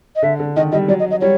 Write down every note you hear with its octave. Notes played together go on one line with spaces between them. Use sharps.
D#5
D3 E5
D3
D#3 D#5
G3 D#5
F#3 D5
D#5
D#5
G3 C#5